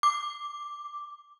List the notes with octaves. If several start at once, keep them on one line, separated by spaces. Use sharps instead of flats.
D6